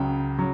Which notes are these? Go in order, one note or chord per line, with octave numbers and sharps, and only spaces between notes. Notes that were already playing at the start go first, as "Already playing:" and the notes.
Already playing: C#2 C#3 F#3 G5
C#3 F#3